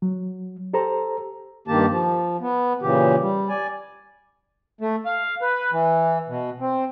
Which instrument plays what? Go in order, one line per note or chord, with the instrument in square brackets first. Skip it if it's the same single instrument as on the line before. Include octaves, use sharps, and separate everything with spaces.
[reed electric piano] F#3
G4 A4 C5 A#5
[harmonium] G2 D#3 A#3 G4 A5
F3
B3
A#2 C#3 E3 G4
G3
D5 G#5
A3
F5
B4
E3
B2
C4